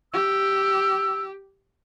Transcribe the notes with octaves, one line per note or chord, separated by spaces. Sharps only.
G4 E6